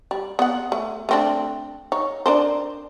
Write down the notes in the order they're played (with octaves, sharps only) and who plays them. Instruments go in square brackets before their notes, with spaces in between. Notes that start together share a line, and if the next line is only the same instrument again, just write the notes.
[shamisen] G3
B3 F#5
A3
A3 C4 D4
D#4 C#5
D4 A#4 C5